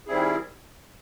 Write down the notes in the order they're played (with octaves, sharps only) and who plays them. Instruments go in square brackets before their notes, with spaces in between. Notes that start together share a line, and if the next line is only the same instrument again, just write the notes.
[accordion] D#3 G3 C4 E4 G#4